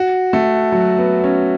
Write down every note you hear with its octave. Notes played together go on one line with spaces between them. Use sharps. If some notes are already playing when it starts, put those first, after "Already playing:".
Already playing: F#4
A3
F#3
B3
C#4